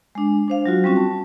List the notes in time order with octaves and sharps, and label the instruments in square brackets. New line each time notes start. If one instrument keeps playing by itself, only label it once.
[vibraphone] G#3 D4
D4 C5 F5
F#3 F4 F#4
G3 C4 C#4 F#4
A5